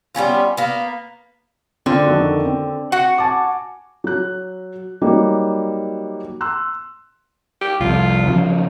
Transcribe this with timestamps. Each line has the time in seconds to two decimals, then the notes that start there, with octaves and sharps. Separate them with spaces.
0.15 G3 B3 C#4 F4
0.57 A#3 B3
1.86 D3 C4 F4
2.06 F2 D#3 F#4
2.45 C4
2.92 F#4 F#5
3.18 G#5 A5 D6
4.04 F#3 F#6
5.01 F#3 G3 A#3 D#4
6.41 C6 E6 F#6
7.61 G4
7.80 C2 F2 F4
8.28 C#3 F3 F#3